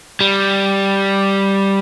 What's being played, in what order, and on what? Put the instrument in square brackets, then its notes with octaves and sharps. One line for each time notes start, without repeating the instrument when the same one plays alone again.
[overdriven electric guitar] G3